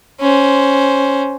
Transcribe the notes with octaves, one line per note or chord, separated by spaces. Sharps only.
C#4 C5